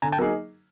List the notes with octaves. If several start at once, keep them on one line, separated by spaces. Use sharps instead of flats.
D3 G#5 A#5
G5 A5
F#3 A#3 D#4 G#4